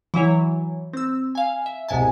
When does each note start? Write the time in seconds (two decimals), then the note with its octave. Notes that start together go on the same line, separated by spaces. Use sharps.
0.14 E3 F#3 E4 C#5
0.93 C4 E6
1.35 F5 G#5
1.66 E5
1.89 C2 G#2 B2 G#5 A5